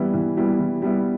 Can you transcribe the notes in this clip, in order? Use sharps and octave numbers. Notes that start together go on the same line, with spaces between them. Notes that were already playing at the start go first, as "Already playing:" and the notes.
Already playing: E3 G3 B3 E4
E3
G3 B3 E4
E3
G3 B3 E4